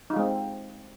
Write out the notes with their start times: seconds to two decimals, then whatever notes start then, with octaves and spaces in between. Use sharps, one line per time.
0.10 D#4
0.13 F4
0.16 G#3
0.19 C4